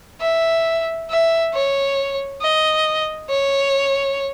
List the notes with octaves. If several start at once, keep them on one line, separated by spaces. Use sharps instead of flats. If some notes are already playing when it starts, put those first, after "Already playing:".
E5
E5
C#5
D#5
C#5